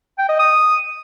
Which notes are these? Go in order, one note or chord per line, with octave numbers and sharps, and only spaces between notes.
G5
D#5
D#6